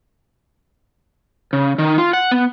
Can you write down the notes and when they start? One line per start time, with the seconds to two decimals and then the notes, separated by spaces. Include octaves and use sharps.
1.53 C#3
1.78 D#3
1.98 F4
2.13 F#5
2.31 B3